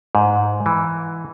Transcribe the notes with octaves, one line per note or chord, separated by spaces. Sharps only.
G#2
E3